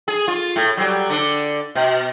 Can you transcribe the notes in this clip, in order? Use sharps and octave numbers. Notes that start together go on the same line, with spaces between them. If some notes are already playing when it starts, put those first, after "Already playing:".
G#4
F4
A2
F#3 G3
D3 D4
B2